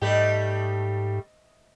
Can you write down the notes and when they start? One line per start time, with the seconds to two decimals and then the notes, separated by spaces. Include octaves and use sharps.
0.02 G#2 G3 A3 G4 D#5 E5